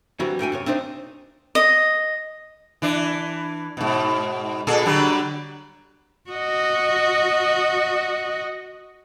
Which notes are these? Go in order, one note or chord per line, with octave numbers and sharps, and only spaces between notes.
D3 E3 F#3 G3 C4
G#2 D3 G5 G#5
F#2 C3 C#5
C4 D4 D#4 C5 D#5
D#5
E3 D4
G#2 B2
A#2 G#4 A4
D3 F#3 G3
F#4 D#5